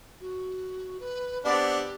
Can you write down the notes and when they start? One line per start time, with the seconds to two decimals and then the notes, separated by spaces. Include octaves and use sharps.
0.20 F#4
1.00 B4
1.45 B3 C4 D4 G4 D5